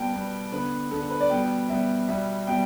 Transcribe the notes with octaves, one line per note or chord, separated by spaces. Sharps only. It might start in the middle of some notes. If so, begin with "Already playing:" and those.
Already playing: B2 G3 B3 G5 A5
B2 G3 B3
D3 B3 B4
D3 B3 A4
A4
B4
D5
B2 G3 B3 G5
B2 G3 B3 E5
B2 G3 B3 E5
B2 G3 G5